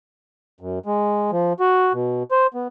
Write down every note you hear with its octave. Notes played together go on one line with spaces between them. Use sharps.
F#2
G#3
F3
F#4
B2
C5
B3